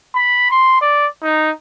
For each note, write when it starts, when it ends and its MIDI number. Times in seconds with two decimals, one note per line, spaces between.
0.15 0.50 83
0.51 0.81 84
0.81 1.07 74
1.23 1.51 63